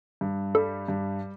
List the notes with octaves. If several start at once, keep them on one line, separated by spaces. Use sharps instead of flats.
G2
G3 A4
G2